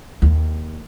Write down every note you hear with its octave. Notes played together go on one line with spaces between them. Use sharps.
D#2